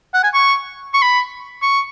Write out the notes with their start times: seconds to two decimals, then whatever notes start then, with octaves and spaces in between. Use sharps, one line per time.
0.14 F#5
0.24 G#5
0.34 C#6
0.94 C#6
1.02 B5
1.62 C#6